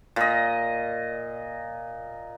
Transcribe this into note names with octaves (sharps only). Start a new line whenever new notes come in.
A#2 D#5